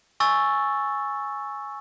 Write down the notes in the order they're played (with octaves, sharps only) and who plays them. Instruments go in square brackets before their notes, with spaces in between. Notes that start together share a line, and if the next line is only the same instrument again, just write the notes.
[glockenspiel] G#5 C#6 E6 A6